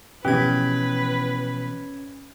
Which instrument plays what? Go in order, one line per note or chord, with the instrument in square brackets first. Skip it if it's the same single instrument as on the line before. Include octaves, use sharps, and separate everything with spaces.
[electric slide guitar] B2 E3 F3 [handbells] C#4 G#6 [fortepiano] G4 [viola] B4